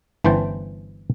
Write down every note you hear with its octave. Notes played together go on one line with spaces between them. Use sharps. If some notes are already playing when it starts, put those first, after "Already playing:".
G1 E3 C#4 C5 G5 A5